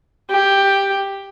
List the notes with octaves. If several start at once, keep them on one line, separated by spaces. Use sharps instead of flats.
G4